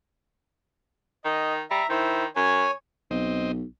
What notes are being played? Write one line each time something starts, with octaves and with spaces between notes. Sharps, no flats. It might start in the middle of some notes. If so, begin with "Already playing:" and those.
D#3 D#5
G3 E5 A#5
D#3 E4 C5
F#2 C#5 G#5
B1 C4 D#5